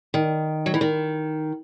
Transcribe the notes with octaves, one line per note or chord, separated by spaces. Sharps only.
D#3
F#3
E3
D#3